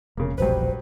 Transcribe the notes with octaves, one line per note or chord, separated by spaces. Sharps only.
E1 C#3 A#3
E1 A#1 G2 F#3 B4 C5